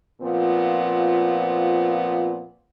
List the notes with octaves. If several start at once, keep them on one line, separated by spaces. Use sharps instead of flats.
A#2 F3 B3 C4 F4